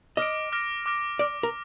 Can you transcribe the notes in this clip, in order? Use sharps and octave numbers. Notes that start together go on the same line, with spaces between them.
D#5 D6 F6 A#6 D7
D6 F6 A#6 D7
D6 F6 A#6 D7
D5 D6 F6 A#6 D7
A#4